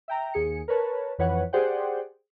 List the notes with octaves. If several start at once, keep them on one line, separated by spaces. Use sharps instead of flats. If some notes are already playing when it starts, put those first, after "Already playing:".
E5 G5 A#5
D#2 G#4 C#7
A#4 B4 C#5 A5
F2 E3 B4 C#5 F#5
G4 G#4 C5 D5 F#5 G5